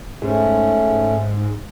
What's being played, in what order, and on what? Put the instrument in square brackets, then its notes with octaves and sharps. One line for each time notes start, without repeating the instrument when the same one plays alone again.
[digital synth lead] G#2 [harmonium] A3 C#4